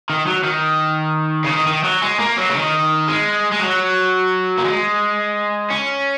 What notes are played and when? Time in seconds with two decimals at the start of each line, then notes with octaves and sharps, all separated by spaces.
0.10 D#3
0.27 F#3
0.44 D#3
1.44 C#3
1.50 D#3
1.67 D#3
1.84 F#3
2.02 G#3
2.20 A#3
2.37 F#3
2.49 C#3
2.55 D#3
3.08 G#3
3.52 G#3
3.60 F#3
4.58 A#3
4.65 G#3
5.70 C#4